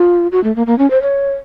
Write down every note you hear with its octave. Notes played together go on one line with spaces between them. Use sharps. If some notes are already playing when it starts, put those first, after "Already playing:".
Already playing: F4
F#4
A3
A#3
A#3
C#4
C5
C#5